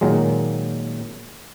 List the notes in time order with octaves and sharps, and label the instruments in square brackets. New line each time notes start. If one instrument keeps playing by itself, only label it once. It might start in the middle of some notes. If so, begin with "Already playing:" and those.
[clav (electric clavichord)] A#2 D#3 F#3 G#3